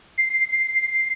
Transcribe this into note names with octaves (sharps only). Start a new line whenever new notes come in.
C7